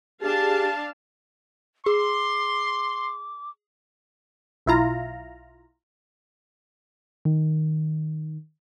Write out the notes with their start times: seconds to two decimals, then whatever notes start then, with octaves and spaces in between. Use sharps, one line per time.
0.22 D4 G4 G#4 F5 A5
1.86 G#4 C6 D6
4.66 B1 E4 F4 A#5
7.25 D#3